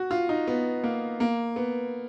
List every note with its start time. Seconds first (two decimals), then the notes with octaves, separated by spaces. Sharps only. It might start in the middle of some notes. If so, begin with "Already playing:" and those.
Already playing: F#4
0.11 F4
0.29 D#4
0.47 B3
0.84 A#3
1.20 A#3
1.56 B3